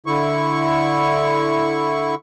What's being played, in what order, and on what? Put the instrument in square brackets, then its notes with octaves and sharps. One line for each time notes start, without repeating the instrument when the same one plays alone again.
[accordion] D3 E4 C#6